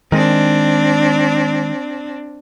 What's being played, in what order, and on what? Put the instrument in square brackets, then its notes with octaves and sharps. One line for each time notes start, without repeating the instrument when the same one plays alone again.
[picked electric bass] D#3 G#3 [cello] C4 D4